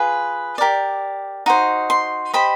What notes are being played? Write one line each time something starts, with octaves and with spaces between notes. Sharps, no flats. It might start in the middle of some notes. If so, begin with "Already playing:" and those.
Already playing: F4 G#4 B4
G4 A#4 D5
D#4 F#4 C5
C6
G4 C5 D#5 B5